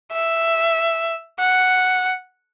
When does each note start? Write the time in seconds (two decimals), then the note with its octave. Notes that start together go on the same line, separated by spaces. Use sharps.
0.12 E5
1.39 F#5